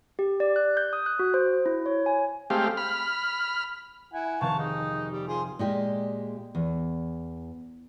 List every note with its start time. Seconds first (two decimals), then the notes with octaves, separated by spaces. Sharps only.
0.19 G4
0.40 D5
0.56 F#6
0.77 G6
0.93 D#6
1.06 F#6
1.19 F#4
1.34 C5
1.66 E4
1.86 C#5
2.06 G#5
2.50 G#3 A3 C4 G4 F5
2.77 B5 F6
4.13 E4 F#5 G#5
4.41 F1 D#3 C4 F5 A5 C#6
4.58 G#3 D#4
5.11 G3
5.28 F3 G#4 C6
5.59 A#2 G#3 G4
6.55 E2